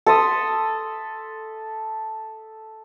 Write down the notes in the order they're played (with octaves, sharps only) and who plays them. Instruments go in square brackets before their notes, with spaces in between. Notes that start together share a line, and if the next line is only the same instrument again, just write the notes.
[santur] A4 E5 C6 D#6